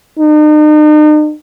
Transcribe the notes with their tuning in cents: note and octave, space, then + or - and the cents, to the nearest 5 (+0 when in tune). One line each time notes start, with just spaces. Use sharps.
D#4 -45